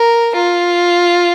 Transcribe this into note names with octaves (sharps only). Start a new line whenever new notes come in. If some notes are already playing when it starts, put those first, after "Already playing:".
Already playing: A#4
F4